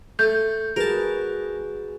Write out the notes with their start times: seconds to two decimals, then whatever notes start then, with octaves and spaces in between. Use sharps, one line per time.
0.19 A3 G6
0.76 F#4 G#4 A#4 B4 A5